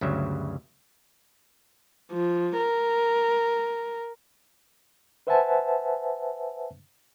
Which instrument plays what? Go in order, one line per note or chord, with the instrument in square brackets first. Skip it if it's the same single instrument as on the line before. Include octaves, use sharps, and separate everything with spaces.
[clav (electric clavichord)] D2 G2 C#3 F#3 E5
[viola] F3
A#4
[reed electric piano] B4 C5 E5 F#5 G#5 A5